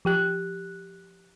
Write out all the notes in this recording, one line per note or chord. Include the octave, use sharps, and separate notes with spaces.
F3 G4 F#6